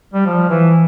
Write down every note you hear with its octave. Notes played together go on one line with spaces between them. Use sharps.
G3
F3
E3